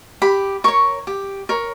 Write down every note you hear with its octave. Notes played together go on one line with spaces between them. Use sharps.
G4 B5
A#4 C#5 C#6
G4
A#4 C#5